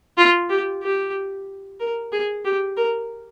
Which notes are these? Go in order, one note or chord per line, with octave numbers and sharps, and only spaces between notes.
F4
G4
G4
A#4
G#4
G4
A#4